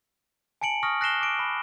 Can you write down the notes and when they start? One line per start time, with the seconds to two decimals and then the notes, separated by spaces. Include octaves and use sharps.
0.61 G#5 A5 C#7 D7 F#7
0.83 C#6 D#6 F6 A#6
1.01 F#6 A#6 C7 E7 G7
1.21 D6 D7
1.39 B5